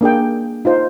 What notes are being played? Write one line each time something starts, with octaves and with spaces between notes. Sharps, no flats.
A#3 D4 G#4 G5
D#4 F4 C5